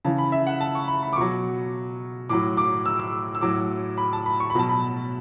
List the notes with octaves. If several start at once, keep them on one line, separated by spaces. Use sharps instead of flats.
C#3 E3 A5
B5
E5
F#5
A5
C#6
B5
B5
D6
B2 F#3 C#6
A2 F#3 D6
D6
E6
E6
E6
A2 F#3 D6
B5
A5
B5
C#6
B5
B2 F#3 A5
B5